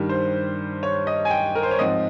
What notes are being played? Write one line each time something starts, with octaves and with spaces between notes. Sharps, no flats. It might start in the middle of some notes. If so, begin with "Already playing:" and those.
Already playing: G2 D#3 G3
C5
C#5
D#5
G#5
G5
A#4
C5
C#5
G#2 F3 C4 D#5